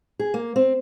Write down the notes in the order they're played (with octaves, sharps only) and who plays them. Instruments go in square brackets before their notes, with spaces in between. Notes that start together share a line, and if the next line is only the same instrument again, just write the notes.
[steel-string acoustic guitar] G#4
A#3
C4